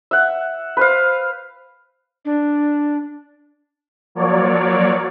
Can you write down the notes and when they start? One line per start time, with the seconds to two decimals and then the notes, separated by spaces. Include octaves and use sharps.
0.11 E5 F#5
0.77 B4 C5 F5
2.25 D4
4.15 F3 F#3 A#3 C#5 D5